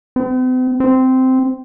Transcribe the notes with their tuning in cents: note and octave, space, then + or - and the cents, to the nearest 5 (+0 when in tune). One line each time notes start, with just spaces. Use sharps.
C4 -45
C4 -10